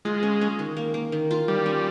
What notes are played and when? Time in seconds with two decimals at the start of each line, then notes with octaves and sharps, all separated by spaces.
0.05 G#3 F4
0.23 C#4
0.41 C#4
0.59 D#3
0.77 A#3
0.94 A#3
1.12 D#3
1.31 F4
1.48 D#3 G3
1.66 C#4